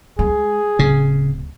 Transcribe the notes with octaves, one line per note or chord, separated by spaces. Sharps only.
G#3 G#4
D1 C#3